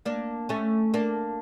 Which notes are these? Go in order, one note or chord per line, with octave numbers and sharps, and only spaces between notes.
A#3 D4
A3 C#4
A#3 D4